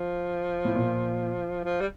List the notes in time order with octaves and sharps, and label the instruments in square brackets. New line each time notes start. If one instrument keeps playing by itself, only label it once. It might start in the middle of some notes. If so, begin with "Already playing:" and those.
Already playing: [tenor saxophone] F3
[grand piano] A2
A#2
[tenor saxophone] F3
G3